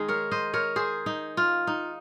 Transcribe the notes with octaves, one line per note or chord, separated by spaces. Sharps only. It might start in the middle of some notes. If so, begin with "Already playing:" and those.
Already playing: D#3 G#3 D#4 G#4
A#4 C#5
C5 D#5
A#4 C#5
G#4 C5
D#4
F4
D#4